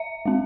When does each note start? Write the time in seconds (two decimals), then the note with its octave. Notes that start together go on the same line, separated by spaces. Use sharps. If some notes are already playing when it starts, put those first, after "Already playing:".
Already playing: E5
0.26 G#3 C4